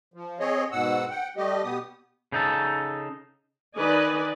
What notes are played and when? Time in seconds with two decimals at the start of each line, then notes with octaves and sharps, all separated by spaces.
0.14 F3
0.40 C4 G#4 C#5 D#5
0.72 G#2 B2 F#5 E6
1.10 F#5 G5
1.37 G3 A3 G4 D#5
1.63 B2 B3 G4 D#6
2.32 C#3 D#4 A4
3.76 D#3 B4 D5 D#5 G#5